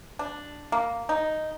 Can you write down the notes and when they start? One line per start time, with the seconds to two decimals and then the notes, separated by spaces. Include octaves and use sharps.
0.19 D4
0.72 A#3
1.09 D#4